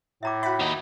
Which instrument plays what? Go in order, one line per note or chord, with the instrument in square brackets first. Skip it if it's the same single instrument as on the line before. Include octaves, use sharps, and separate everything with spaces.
[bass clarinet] A2 [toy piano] E5 A#5 D6
[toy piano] F#4 E5 [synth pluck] F#5 B5
[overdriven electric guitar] D#2 D#4